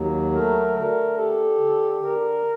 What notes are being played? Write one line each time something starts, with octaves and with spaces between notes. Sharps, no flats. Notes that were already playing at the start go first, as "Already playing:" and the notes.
Already playing: D#2 F#3
A3 A#4
D3 A#4
G4 A4
D3
D3 A#4